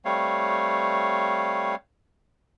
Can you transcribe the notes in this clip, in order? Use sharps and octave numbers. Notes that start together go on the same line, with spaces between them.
G3 A3 C4 C#5 F5